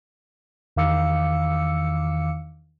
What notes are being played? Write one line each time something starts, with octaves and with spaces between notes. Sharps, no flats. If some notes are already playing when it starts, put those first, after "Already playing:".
E2 D#3 F5 D6 E6 C#7